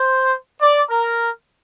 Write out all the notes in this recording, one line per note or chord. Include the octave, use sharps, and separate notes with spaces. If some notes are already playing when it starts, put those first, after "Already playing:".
Already playing: C5
D5
A#4